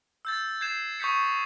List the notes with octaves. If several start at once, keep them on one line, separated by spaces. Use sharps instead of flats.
E6 G6 A6
G6 G#6 C7 E7
C#6 D#6 G6 B6 C#7